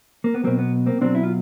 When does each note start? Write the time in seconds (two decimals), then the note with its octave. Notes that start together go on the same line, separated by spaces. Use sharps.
0.24 A#3
0.34 B3
0.44 B2 F#3 A#3 C4
0.59 B3
0.86 A#3 C4
1.01 B2 F#3 C4 D4
1.15 E4
1.23 F4